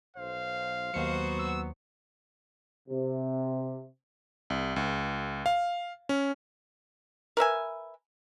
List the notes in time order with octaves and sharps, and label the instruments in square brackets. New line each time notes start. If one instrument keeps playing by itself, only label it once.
[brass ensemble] B1 C5 [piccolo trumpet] F5
[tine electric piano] D#2 C#7 [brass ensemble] F#3 B3 [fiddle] F#4 C5
[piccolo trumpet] E6
[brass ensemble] C3
[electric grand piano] C2
C#2
F5
C#4
[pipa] A#4 B4 E5 G#5